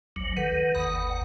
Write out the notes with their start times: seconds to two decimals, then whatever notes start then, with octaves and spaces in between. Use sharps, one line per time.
0.16 G#1 D2 F#3
0.37 D#3 A4 B4 F#5
0.75 G1 D#2 F#5 B5 D#6